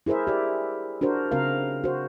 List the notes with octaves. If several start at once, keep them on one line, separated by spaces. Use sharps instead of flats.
E4 G#4 A#4 C5 E5
G4 D5
D4 F#4 A#4 C5
C#3 C4 F#4 A#4 F5
F#4 C5